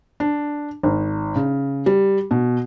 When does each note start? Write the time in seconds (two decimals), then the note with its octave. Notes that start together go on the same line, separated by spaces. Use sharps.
0.20 D4
0.83 G#1
1.36 C#3
1.86 G3
2.31 B2